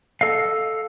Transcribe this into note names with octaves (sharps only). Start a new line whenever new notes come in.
A4 D#5 F5